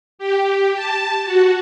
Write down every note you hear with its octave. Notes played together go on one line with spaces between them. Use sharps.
G4
A5
F#4